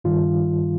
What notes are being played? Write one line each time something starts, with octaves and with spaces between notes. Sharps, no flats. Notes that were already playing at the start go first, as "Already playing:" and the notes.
G2 D#3 G3 F4